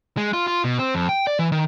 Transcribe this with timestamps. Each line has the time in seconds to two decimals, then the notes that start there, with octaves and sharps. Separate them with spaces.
0.17 G#3
0.33 F4
0.47 F4
0.64 B2
0.79 C4
0.95 F2
1.09 G5
1.27 D5
1.39 E3
1.52 D#3